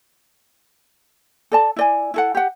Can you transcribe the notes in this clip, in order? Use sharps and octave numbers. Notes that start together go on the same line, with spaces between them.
A4 D5 A5
E4 D5 G#5
E4 A4 F#5
G4 F#5